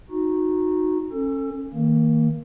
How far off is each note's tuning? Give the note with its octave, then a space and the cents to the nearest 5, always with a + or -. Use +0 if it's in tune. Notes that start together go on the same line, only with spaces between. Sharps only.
D#4 +0 F#4 -20
C#4 -25 A4 +20
D#3 +30 A#3 -20